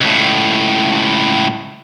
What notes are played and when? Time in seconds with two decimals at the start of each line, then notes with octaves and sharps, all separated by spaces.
0.01 C#2 A2